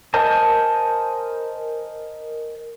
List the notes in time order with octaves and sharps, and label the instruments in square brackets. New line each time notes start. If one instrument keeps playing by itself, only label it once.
[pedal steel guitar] A#4 C5 D#5 G#5 A5